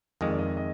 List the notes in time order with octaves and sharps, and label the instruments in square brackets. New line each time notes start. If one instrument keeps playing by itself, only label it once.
[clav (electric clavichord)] F2 D#3 G#3 [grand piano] D#5
[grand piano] D5
D#5
D#5